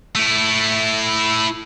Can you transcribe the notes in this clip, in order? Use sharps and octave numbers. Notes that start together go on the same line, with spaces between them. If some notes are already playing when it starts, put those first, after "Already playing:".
A3 E4